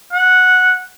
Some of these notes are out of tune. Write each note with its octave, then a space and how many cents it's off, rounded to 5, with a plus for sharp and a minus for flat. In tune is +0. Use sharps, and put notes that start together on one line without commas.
F#5 -10